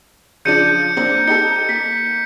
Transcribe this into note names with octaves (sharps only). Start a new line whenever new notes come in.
C#3 F3 D4 G6 C#7 D#7
A#3 C4 D4
D#4 G4 A4 C#7
A#3 B6